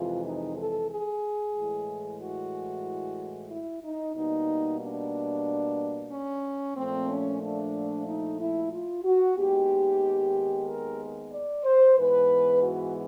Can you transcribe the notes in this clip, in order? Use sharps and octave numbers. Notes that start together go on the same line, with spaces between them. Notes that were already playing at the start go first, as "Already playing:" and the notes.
Already playing: F2 C3 E3 G#3 F4
D#4
A4
G#4
A2 E3 G#3
F#4
E4
D#4
B2 G3 A#3 D#4
D4
C#4
A#2 F3 A3 C4
C#4
D4
D#4
E4
F4
F#4
D#2 D#3 G#3 B3 G4
A#4
D5
C5
G#2 E3 G#3 B3 B4
F#4